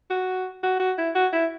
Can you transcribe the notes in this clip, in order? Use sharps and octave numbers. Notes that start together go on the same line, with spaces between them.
F#4
F#4
F#4
E4
F#4
E4